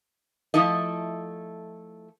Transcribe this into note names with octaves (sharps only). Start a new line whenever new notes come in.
F3 A3 E4 A4 D#5